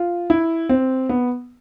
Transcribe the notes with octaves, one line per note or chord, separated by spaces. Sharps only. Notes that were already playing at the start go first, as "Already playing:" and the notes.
Already playing: F4
E4
C4
B3